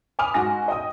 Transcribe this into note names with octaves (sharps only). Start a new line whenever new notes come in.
G#5 B5 D6 D#6 F6 F7
G#2 F#4 G#5 A#6
D#5 G5 D#6